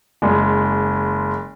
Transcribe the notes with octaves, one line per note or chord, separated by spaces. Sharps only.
F#1 G#3